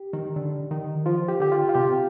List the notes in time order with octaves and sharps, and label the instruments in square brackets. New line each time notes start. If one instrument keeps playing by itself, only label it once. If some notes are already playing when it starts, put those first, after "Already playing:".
Already playing: [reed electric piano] G4
[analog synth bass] D#3
D3
D#3
[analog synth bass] F3 [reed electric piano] F4
[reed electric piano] G4
[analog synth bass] D3 [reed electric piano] G4
[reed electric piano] F4
F4
[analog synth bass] C3 [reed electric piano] G4